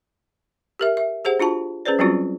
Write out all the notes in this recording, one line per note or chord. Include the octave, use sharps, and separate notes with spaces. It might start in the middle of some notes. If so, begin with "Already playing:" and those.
G4 A#4 E5
E5
G4 G#4 C5 F#5
D4 F4 F#4 A5
C#4 G#4 B4 C5 D5
F#3 G3 C4 C#4 F4 F#4